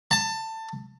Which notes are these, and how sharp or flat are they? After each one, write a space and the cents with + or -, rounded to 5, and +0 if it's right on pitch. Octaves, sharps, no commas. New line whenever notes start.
A5 +20